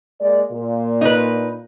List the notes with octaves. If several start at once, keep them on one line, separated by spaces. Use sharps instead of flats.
G#3 A#3 D5
A#2
D#4 B4